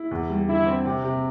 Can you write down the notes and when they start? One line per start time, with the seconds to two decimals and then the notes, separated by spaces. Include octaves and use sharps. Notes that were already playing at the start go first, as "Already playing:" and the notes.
Already playing: E4
0.11 E2
0.30 G3
0.48 D3 E4
0.66 C4
0.85 C3
1.04 C3